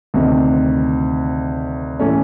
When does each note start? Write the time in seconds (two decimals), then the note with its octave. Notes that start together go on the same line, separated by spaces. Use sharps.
0.14 D2 C3 D#3
2.00 A2 E3 A3 C#4